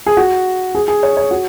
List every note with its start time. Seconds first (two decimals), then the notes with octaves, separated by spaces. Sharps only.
0.06 G#4
0.17 F#4
0.75 G#4
0.88 G#4
1.03 C#5
1.17 C#5
1.31 F#4